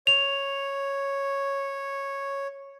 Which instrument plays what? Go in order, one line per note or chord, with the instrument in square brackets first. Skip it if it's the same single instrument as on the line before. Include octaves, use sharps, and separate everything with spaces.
[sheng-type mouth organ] C#5 [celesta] F7